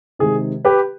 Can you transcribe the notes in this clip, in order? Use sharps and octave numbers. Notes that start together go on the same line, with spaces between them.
C3 D#3 G#3 G#4
G4 B4